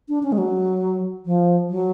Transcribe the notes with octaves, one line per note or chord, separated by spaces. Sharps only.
D4
C#4
G#3
F#3
F3
F#3